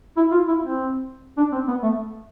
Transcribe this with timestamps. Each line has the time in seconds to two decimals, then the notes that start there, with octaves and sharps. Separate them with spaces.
0.17 E4
0.31 F4
0.48 E4
0.63 C4
1.37 D4
1.52 C4
1.68 B3
1.83 A3